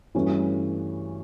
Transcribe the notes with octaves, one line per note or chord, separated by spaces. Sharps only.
G2 E3 A3 C#4 F#4